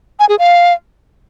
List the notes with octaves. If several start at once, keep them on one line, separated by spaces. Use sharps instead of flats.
G#5
G#4
F5